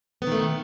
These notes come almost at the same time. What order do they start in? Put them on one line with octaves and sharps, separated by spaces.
B3 D#3 A3